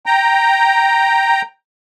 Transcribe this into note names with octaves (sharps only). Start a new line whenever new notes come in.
G5 A#5